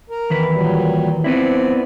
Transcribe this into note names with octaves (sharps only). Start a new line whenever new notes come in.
A#4
D#2 E3 B4
A#2 F#3 G3
F3 B3 C4 E4 D5